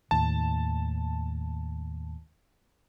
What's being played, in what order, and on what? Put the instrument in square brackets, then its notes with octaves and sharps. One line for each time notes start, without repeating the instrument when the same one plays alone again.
[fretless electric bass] D#2 A2 D#3 [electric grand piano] A5